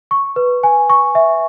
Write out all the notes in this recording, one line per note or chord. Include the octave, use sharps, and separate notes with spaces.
C#6
B4
G#5
C#6
E5